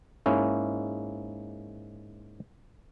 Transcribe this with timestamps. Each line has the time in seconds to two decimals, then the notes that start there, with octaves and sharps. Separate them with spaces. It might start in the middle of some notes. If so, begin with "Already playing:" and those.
0.26 G#2 A#3 C#4 E4